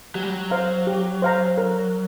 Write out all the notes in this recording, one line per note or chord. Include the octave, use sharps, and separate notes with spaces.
F#3 G4
G3
F#3
C5 F5 A#5
G4
C5 F5 A#5
A#4